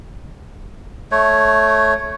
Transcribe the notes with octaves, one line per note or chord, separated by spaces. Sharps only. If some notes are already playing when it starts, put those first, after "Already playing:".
A3 C#5